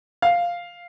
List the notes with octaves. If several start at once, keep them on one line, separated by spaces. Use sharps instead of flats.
F5